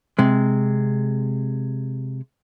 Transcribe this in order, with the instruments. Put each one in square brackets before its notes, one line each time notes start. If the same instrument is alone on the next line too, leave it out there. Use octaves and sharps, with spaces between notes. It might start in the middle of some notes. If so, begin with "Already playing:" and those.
[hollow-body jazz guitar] C3 G#3